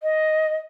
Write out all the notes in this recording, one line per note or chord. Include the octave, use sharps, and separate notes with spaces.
D#5